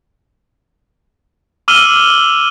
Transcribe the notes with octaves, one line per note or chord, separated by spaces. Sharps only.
D6 E6 F6 D#7 F#7 G7